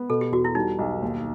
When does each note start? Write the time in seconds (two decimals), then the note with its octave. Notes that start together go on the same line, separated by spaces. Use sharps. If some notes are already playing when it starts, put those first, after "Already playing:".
Already playing: B3
0.09 B2 A4
0.21 G4
0.32 E2 F#4
0.44 E4
0.55 G3 D#4
0.79 B1
1.02 D#2